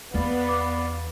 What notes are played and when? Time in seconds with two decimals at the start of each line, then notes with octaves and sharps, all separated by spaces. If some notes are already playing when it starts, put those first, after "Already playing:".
0.14 E2 B3 D5 F5
0.49 D6